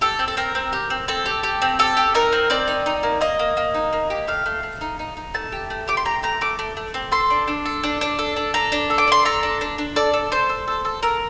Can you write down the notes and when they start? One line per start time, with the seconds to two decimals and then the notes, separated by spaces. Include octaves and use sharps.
0.01 G4 A4
0.19 C4
0.28 A4
0.37 C4 A#4
0.55 C4
0.73 G4
0.90 C4
1.08 C4 A4
1.26 G4
1.43 G4
1.62 C4
1.79 G4 A4
1.97 G4
2.15 D#4 A#4
2.33 C4
2.50 C4 D5
2.68 D#4
2.86 D#4
3.03 A#3
3.21 A#3 D#5
3.39 A#3
3.57 A#3
3.74 D#4
3.93 A#3
4.10 G4
4.28 A3 F5
4.46 A3
4.63 A3
4.81 D#4
4.99 D#4
5.17 D#4
5.34 A3 A5
5.52 G4
5.70 A3
5.88 G4 D6
5.97 C6
6.05 G4 A#5
6.23 A3 A#5
6.41 A3 D6
6.59 A3
6.77 A3
6.94 C4
7.12 A4 C6
7.30 D4
7.48 D4
7.65 A4
7.84 D4
8.01 D4
8.19 A4
8.36 D4
8.54 A4 A#5
8.72 D4
8.90 A4
8.98 D6
9.08 D4 C6
9.25 A4 A#5
9.43 D4
9.61 D4
9.78 D4
9.96 A4 D5
10.14 A4
10.32 A4 C5
10.49 A4
10.68 A4
10.85 A4
11.03 A4 A#4